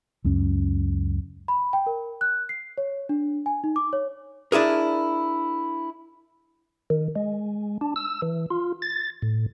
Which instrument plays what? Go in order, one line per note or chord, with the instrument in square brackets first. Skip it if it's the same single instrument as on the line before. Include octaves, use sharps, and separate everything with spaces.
[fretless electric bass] C#2 F#2 C#4
[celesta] B5
G5
A#4
F#6
C7
C#5
D4
G#5
D#4
D6
C#5
[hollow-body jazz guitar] D4 E4 G#4 A#4
[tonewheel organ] D#3
G#3
D4
E6
E3
F4
A6
A2